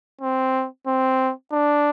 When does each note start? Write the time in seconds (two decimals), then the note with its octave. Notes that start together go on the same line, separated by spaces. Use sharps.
0.21 C4
0.87 C4
1.52 D4